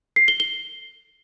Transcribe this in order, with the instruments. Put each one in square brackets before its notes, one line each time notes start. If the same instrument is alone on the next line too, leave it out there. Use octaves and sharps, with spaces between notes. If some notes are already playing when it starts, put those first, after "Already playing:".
[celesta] C7
G7
G7